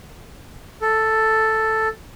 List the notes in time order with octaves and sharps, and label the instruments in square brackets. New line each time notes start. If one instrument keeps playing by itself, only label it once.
[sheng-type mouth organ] A4